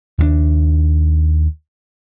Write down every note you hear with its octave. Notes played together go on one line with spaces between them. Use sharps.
D#2 G3 D4